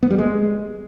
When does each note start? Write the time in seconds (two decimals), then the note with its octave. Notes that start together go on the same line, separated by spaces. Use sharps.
0.03 B3
0.11 G3
0.18 G#3